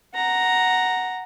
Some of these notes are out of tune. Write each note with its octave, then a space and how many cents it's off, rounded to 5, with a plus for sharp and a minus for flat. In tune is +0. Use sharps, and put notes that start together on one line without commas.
F#5 +0 A#5 +0